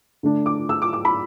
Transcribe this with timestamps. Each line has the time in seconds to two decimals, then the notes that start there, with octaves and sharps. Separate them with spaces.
0.23 D3 A3 D4
0.46 D6
0.69 E6
0.82 D6
0.93 D6
1.05 B5